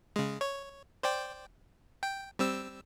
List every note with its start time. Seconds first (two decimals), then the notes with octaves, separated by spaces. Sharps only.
0.16 C#3 G#3
0.41 C#5
1.03 C5 D5 G5
2.03 G5
2.39 G3 C4 E6